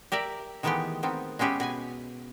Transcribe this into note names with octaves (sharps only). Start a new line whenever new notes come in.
G4 A#4 D5 E5
D#3 E3 G#3 A3 B3 G4
D#3 B3 C4
G#3 B3 C#4 G4 B4 E5
B2 B4 G#5